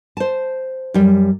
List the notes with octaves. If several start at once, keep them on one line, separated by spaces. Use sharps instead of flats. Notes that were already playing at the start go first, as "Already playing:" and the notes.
C5 A5
F#2 G3